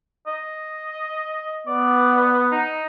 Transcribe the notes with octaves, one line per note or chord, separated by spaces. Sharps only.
D#5
B3 D5
D#4